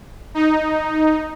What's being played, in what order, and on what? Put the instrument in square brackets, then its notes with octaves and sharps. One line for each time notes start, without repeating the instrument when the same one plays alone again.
[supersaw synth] D#4